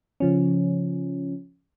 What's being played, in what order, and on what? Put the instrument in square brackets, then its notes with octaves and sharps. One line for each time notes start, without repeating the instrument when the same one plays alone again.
[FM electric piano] C#3 F3 C#4